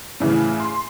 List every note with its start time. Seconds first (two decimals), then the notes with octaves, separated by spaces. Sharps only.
0.20 A2 C#3 E3
0.60 C6